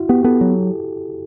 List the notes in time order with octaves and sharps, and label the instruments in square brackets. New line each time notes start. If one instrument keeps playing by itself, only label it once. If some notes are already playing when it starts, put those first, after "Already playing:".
Already playing: [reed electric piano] E4 F#4
[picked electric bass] B3 [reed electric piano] G4
[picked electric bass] B3 [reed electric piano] A4
[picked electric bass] F#3